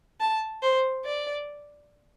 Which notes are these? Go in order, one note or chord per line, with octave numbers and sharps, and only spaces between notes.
A5
C5
D5